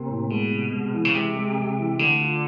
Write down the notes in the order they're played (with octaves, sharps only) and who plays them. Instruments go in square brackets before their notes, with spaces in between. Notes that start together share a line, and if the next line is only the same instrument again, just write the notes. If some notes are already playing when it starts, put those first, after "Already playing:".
Already playing: [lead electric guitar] C3 [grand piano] A#3
[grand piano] A2
[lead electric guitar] B2 [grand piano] G#3
[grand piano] C3
G#3
E3
[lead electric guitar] C#3
[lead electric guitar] C3 [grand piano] G#3
[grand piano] G#3
G#3
E3
[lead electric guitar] D3 [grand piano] A3
[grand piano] F4